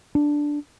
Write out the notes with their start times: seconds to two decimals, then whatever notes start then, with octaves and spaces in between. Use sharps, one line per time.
0.15 D4